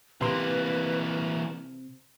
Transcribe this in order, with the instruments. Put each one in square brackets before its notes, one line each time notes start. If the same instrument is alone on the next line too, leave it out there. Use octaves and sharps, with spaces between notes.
[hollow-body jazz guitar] C3 C6 [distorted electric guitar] E3 A#3 [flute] B4